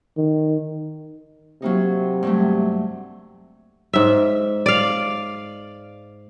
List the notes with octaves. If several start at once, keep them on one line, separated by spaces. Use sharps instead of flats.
D#3
C3 F#3 A#3 D#4
G2 F#3 A3
G#2 E5
D5 F5